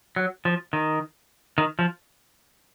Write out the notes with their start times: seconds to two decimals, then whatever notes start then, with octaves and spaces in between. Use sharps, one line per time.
0.16 F#3
0.45 F3
0.73 D#3
1.58 D#3
1.79 F3